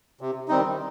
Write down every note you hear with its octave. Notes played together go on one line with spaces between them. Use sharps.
C3
D#3 G3 C4 D#4